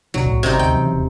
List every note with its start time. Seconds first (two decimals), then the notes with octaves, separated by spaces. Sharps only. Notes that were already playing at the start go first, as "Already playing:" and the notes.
0.14 D2 B2 F#3 D4
0.26 C2 A2
0.43 G#1 C3 C4 D#4
0.59 D2 G5
0.74 C#3 E3 F#3
0.93 D#1